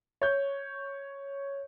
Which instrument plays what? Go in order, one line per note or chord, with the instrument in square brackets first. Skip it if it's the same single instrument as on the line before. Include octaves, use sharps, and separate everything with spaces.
[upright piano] C#5 G6